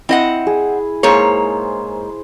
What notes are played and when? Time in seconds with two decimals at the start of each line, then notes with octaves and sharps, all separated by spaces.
0.09 C4 E4 D#5 F#5
0.47 G#4
1.03 G#2 A#3 G#4 C5 C#5